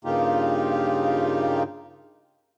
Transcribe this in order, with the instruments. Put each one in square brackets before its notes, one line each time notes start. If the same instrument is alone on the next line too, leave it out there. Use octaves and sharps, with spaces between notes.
[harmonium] G2 C#3 A#3 D#4 F4 G4